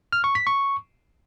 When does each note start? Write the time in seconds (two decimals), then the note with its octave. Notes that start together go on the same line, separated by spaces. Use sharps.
0.12 F6
0.24 C#6
0.35 B6
0.47 C#6